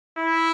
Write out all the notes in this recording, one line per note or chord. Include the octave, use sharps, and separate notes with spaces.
E4